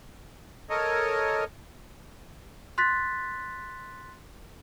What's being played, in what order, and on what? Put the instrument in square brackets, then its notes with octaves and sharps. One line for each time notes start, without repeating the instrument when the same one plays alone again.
[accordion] A4 A#4 C#5 D#5
[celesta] C6 F#6 A6 B6